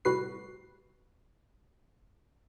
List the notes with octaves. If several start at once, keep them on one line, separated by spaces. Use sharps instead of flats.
A2 C3 G3 F#4 B4 C7